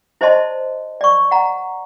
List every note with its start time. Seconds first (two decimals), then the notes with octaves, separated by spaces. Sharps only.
0.21 E4 C5 D5 D#5 A5 C6
1.01 D5 C#6
1.31 F#5 A#5